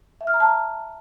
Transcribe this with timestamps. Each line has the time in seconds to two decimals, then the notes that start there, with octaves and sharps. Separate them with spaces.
0.21 E5
0.27 F6
0.34 A#5
0.40 A5